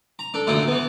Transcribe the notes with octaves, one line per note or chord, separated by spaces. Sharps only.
A#5
D4 A4
A#1 F#2 D3 A3 E4
E3 B3